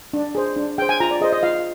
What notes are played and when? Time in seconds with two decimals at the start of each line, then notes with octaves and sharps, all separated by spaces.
0.13 D4
0.35 G#4 C5
0.56 D4
0.78 G#4 C5 G5
0.89 G#5
1.00 F4 A#5
1.11 D5
1.21 G#4 C5 D#5
1.33 D#5
1.43 F4 F5